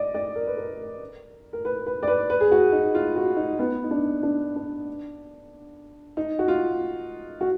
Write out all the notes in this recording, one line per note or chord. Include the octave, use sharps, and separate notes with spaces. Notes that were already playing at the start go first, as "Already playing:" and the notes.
Already playing: D5 D#5
D5
A#4
B4
A#4
A#4
B4
B4
D5
B4
B4
G#4
F#4
D#4
F4
F#4
D#4
B3
D#4
D4
D4
D4
D#4
F#4
F4
F#4